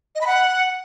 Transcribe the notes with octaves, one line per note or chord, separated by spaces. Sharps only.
D#5
B5
F#5